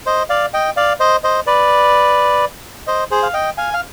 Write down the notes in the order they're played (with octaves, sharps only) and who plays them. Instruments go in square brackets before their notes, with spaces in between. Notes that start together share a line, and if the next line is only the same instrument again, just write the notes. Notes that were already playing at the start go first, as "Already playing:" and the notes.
[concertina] C5 D#5
D5 F5
D#5 G5
D5 F5
C5 D#5
C5 D#5
B4 D5
C5 D#5
G#4 C5
F5
D#5 G5
F5 G#5
F5